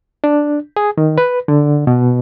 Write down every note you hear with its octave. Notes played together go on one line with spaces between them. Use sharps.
D4
G#4
D#3
B4
D3
B2